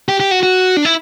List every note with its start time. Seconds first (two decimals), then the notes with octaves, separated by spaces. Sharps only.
0.09 G4
0.20 G4
0.31 F#4
0.43 F#4
0.77 D4
0.85 E4